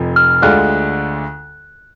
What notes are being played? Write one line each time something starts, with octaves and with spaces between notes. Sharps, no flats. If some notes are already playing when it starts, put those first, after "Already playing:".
Already playing: F1 F2 F3
F6
D2 D3 G#3 D4 F4 F#6